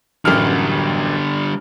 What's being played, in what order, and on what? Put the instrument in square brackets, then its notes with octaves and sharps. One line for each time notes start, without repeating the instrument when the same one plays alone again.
[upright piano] A1 F#2 F6 [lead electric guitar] D3 G3